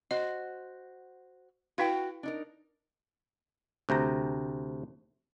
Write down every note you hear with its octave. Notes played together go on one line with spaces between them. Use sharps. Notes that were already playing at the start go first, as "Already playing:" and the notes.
F#4 C5 D#5
E4 F#4 B4 F5 G5
D4 D#4 A#4
D2 C3 G5 A#5